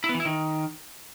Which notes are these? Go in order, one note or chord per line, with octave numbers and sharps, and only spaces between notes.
E4
B3
E3
E4
D#3